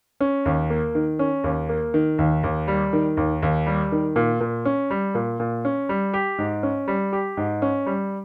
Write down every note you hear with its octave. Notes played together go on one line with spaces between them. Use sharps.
C#4
D#2
A#3
D#3
C#4
D#2
A#3
D#3
D#2
D#2
G3
D#3
D#2
D#2
G3
D#3
A#2
A#2
C#4
G3
A#2
A#2
C#4
G3
G4
G#2
C#4
G3
G4
G#2
C#4
G3